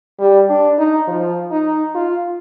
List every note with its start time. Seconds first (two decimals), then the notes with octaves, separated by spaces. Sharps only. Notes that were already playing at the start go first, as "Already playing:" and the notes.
0.20 G3
0.50 D4
0.79 D#4
1.08 F3
1.51 D#4
1.95 F4